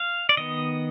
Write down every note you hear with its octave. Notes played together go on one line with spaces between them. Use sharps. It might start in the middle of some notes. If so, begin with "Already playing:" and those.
Already playing: F5
D5
D#3 B3 D#5